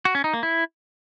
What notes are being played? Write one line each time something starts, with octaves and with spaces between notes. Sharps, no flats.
F#4
C#4
D#4
A#3
E4